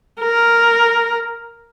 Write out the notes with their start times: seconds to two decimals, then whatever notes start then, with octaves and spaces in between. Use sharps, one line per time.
0.21 A#4